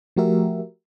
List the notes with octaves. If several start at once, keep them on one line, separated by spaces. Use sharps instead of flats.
F3 A3 F#4 G4 A#4 E5